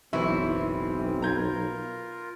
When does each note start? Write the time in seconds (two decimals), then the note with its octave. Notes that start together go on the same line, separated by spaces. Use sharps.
0.13 F#1 B1 E3 C4 E4 C#6
1.22 F4 A#4 A#5 G6 G#6